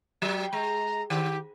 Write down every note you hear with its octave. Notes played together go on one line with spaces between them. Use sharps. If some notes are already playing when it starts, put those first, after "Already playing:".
F#3 G4
G#3 A#5
D#3 G4